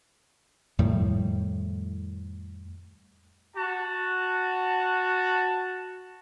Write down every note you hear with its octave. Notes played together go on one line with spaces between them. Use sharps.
F2 A2 D#3 G3
F#4 A5